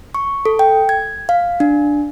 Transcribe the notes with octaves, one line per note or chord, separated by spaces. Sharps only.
C#6
A4
G5
G#6
F5
D4